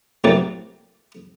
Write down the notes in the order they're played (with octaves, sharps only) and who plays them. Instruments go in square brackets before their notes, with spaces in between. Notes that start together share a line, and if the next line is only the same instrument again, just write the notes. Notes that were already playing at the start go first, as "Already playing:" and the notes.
[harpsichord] A1 C3 F#3 A#3 D5